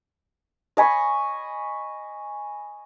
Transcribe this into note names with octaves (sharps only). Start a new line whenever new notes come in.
D#5 G#5 B5 C#6